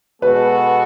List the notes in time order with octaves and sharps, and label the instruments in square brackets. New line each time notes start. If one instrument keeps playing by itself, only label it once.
[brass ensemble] B2 G#3 B3 F#4 A4 [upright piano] B4